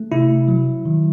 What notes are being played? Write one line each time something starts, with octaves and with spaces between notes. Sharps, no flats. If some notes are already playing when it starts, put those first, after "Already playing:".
Already playing: A3
C3 E4
F#3
D#3